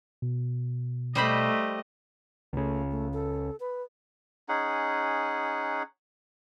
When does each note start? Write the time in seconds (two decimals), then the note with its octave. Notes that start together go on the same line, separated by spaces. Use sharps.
0.22 B2
1.15 G3 A3 C5 D#5 B5
2.53 C#2 C#3 A3
2.91 A3
3.13 A4
3.60 B4
4.49 C#4 D#4 G#4 F#5